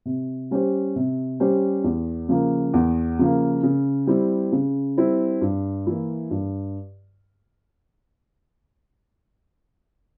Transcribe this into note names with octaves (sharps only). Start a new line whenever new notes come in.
C3
G3 C#4 G4 C5
C3
G3 C#4 G4 C5
E2
C#3 F3 A#3
E2
C#3 F3 A#3
C#3
G3 C4 E4
C#3
G3 C4 E4
G2
E3 A#3 E4
G2